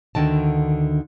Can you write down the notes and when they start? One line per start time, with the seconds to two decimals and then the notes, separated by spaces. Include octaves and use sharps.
0.15 D2 D3 D#3 A5